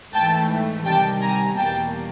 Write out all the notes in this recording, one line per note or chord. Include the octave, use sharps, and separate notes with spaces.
G#2 E3 A3 G5 A5
C3 D#3 G3 G5 A5
G#5 A#5
E2 B2 G3 A#3 G5 A5